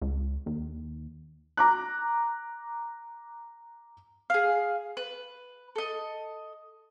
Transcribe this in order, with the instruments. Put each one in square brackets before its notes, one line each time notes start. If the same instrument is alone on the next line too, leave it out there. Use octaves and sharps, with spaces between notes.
[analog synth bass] C#2
D#2
[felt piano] A#5 D6 F#6
[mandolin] G#4 F5
B4
A4 D#5